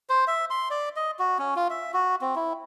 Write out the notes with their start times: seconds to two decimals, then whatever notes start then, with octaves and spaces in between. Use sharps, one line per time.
0.09 C5
0.27 E5
0.50 C6
0.71 D5
0.96 D#5
1.19 F#4
1.39 C#4
1.56 F4
1.70 E5
1.93 F#4
2.21 C4
2.36 E4